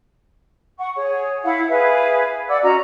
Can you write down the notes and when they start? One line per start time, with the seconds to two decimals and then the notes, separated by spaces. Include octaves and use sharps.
0.78 F#5 C#6
0.96 G#4 C#5
1.43 E4 F5 F#5
1.69 G#4 B4 E5 F5
2.48 D5 F#5 D6 E6
2.63 C#4 F#4 D#5 A#5